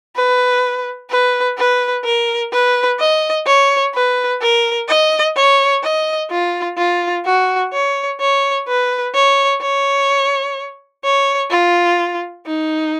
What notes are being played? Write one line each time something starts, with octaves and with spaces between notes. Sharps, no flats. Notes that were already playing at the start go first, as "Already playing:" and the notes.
B4
B4
B4
A#4
B4
D#5
C#5
B4
A#4
D#5
C#5
D#5
F4
F4
F#4
C#5
C#5
B4
C#5
C#5
C#5
F4
D#4